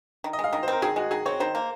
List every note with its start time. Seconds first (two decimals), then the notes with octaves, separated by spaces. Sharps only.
0.24 D#3
0.33 D#5
0.39 G#3
0.44 F5
0.53 D#3 D#5
0.63 C5
0.68 C4 A#4
0.82 D#3 G#4
0.96 G#3 F#4
1.11 D#3 G#4
1.26 C4 C#5
1.40 D#3 C5
1.55 A#3